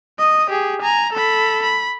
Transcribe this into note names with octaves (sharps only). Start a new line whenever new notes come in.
D#5 D#6
G4 G#4
G#5 A#5
A4 B5
B5